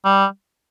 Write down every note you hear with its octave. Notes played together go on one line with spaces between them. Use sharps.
G3